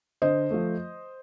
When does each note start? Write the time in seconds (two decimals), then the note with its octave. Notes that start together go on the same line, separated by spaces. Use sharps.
0.22 D3 C5 D#5
0.50 F3 A3